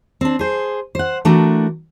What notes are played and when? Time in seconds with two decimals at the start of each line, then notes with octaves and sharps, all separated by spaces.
0.21 C4 D4
0.39 G#4 C5
0.95 C5 F#5
1.25 E3 A3 D4 F#4 A#4